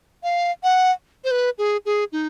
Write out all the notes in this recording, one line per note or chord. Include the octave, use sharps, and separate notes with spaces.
F5
F#5
C5
B4
G#4
G#4
D#4